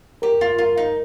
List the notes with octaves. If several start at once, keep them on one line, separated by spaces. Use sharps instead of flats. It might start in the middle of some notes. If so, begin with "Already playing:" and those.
G4 A#4
F4
F4 A#4
D#4